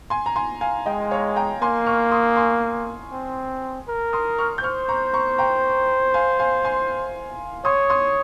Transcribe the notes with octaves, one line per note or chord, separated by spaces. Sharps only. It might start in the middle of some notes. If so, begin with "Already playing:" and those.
G#5 C6
A#5
G#5 C6
F5 G#5
G#3 D#5 G5
C#5 F5
G5 A#5
A#3 G#5 C6
C#6 F6
C6 D#6
G#5 C6
C4
A#4
C6 D#6
C#6 F6
G6
C5 C#6 F6
A#5 C#6
A#5 C#6
G5 A#5
F5 G#5
F5 G#5
G#5 C6
C#5 C6 D#6
C6 D#6